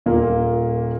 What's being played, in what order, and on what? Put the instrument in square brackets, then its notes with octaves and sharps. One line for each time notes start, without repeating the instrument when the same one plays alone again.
[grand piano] D#1 A#2 A#3